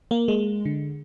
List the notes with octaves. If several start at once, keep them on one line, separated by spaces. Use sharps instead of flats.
A#3
G#3
D3